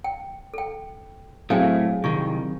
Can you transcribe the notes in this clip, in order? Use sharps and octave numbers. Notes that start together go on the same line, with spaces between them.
G5
A4 G5
A2 F#3 A3 C4 G#4 F5 G5
C2 D#3 F4 C#6